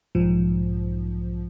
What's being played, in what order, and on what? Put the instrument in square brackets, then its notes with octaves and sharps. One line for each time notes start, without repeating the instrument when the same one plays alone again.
[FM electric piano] B1 G#2 F3